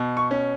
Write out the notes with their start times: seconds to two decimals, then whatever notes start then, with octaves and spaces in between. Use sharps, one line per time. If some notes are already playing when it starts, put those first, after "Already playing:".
Already playing: B2
0.17 C#6
0.31 C#4